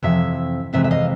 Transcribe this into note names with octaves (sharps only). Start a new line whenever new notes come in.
F2 C3 E3 E5
F2 C3 E3 G#3 E5
E5
D#5 F5